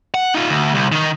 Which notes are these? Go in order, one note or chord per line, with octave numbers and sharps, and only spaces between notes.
F#5
D#4 F4
D2
C2
D#3 D#4